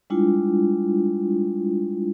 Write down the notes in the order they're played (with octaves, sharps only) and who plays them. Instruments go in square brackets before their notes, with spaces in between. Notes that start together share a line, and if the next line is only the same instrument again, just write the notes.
[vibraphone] G3 G#3 D4 E4 F4